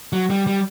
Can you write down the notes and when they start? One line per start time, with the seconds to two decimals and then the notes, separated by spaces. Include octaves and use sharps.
0.13 F#3
0.30 G3
0.47 G3